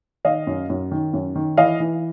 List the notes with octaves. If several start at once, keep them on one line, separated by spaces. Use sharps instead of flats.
D#3 D#5 F5
F#2
F#2
D#3
F#2
D#3
E3 D#5 F5
E3